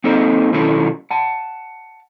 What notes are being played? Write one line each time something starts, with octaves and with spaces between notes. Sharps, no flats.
A#3 C4 D#4 A4 C5 D#5
B2 D#3 F#3 C#4 E4 A4
F#5 A5